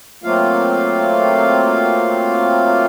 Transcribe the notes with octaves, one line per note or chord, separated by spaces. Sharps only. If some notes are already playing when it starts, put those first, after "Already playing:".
F#3 A3 A#3 C4 F4 F5